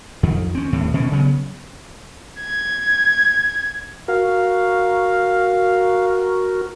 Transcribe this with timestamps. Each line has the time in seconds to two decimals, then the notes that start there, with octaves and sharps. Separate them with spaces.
0.23 F2 D#3
0.55 C4 C#4
0.73 D#2 A2 C3
0.94 B2 D#3 C#4
1.12 C#3 F#3 B3
2.40 G#6
4.08 F#4 A#4 F5